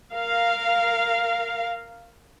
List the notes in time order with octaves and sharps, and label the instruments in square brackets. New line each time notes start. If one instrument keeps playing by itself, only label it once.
[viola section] A#4 F5